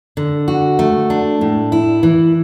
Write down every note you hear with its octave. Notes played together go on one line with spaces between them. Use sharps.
D3
F#4
A3
D4
A2
E4
E3